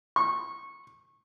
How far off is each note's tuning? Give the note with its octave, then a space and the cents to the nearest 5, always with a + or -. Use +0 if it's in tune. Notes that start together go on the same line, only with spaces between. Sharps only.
C#6 -20